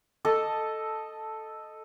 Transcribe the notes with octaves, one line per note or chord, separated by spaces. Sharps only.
A4 D#5 A5